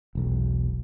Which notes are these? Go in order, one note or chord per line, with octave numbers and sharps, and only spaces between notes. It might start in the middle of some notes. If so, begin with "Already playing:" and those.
E1 B1